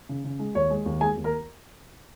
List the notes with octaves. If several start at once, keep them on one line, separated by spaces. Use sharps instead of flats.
C#3
C#3
G#3
D#2 C#5
G#3
D#2
G#3 G#4 G#5
D#2
A#4 A#5